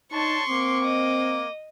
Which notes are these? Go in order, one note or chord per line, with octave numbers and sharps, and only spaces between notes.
D4 D#4 C#5 A5 C6 C#6
A#3 C4 D6
D#5